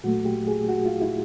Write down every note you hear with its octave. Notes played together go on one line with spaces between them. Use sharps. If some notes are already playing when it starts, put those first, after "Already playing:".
A#2 F#3 A3 F#4
G4
G#4
F#4
F4
E4